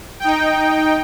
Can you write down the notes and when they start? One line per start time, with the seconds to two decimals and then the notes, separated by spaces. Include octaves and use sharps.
0.20 D#4 G5